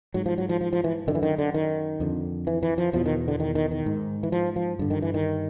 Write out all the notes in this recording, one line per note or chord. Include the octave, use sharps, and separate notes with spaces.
G#2 F#3
F3
F#3
F3
F3
F3
E3
F#2 D3 D#3
E3
D#3
D3
D#3
F2 D3
E3
E3
F3
E2 B2 F3
D#3
D3
D#3
D#3
D#3
G#2
E3
F3
F3
G2 D3
D#3
E3
D#3